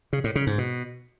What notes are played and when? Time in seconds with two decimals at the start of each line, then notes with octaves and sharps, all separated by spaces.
0.13 C#3
0.24 A2
0.35 C#3
0.47 G#2
0.58 B2